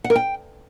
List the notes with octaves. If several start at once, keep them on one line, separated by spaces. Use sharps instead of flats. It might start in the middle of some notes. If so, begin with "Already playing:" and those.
F#5
A#4
G5